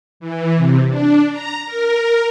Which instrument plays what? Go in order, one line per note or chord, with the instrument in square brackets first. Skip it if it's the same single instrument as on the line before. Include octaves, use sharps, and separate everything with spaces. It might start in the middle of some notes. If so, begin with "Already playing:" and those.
[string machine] E3
C3
D4
A#5
A#4